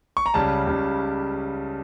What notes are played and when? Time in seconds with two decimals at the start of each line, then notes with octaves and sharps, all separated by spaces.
0.17 C#6
0.26 A#5
0.34 C#2 C#3 G3 A5
0.67 C#2 C#3 G3